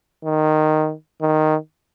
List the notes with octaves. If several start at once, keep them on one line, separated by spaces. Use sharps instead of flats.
D#3
D#3